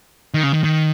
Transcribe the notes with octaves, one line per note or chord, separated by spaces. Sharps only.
D#3
C#3
D#3
D#3